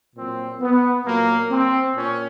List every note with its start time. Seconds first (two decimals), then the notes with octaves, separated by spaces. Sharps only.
0.16 A#2 F#3 C4
0.61 B3
1.05 A#2 F#3 A#3
1.50 C4
1.95 A#2 C#4